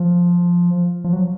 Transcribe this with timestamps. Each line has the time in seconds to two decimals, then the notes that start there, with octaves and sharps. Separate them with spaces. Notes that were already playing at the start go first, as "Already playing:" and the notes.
Already playing: F3
1.04 F3
1.13 F#3